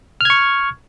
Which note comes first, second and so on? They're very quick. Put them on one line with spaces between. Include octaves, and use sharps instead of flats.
F6 G#6 C#6